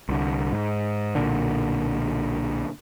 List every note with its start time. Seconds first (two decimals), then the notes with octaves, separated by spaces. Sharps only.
0.09 C2 D3
0.52 G#2
1.15 B1 A#2 D3